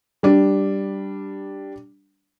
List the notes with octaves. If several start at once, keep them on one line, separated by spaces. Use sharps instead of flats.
G3 D4